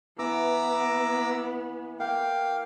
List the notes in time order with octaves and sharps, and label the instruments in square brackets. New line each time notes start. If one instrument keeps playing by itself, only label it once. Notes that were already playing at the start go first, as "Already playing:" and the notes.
[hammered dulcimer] E3 [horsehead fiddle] B3 [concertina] A#5 D6 E6
[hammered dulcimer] A#3 [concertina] F5 [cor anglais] G5